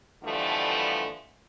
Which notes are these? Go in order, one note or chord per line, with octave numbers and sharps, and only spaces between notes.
B2 D3 E3 F3 G3 A3